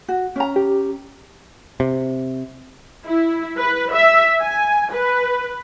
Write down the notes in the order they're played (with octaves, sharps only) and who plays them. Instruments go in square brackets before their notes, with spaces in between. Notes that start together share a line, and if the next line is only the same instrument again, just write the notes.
[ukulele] F#4
C#4 A#5
[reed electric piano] G4
[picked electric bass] C3
[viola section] E4
B4
E5
G#5
B4